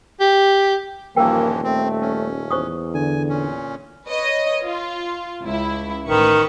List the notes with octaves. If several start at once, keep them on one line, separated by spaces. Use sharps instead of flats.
G4
D#1 G2 E3 F3 A#3 A#4 G5
A3 C4
C#4
E2 C5 C#6 D#6
D3 G#5
A#2 C#4
B4 C#5 D#5
F4
C#2 E4
A1 D#3 B4 C#6